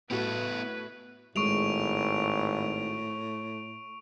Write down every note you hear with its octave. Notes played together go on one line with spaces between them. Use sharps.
A2 B3 F#4 A4 B4
G#1 A2 G#3 C#6 D7 F7